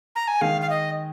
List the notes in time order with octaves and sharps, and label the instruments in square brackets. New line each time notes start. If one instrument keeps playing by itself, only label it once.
[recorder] A#5
G#5
[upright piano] D#3 G#3 [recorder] F5
[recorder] F5
D#5